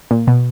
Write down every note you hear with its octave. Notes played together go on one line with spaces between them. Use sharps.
A#2
B2